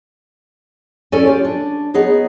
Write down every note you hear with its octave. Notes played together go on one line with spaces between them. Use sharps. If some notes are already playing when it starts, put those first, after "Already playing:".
C#4 E4 A4 C#5 D5 G#5
F4 G4
D4
B3 D#4 G#4 C#5